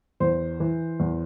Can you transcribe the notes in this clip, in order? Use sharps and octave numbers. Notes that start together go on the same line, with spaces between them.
E2 C5
E3
E2